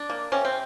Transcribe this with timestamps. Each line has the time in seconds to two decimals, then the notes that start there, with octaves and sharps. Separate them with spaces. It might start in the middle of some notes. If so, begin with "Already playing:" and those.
Already playing: D4
0.10 A#3
0.32 C3 C#4
0.45 C4